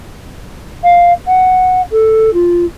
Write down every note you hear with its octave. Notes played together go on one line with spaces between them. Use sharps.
F5
F#5
A4
F4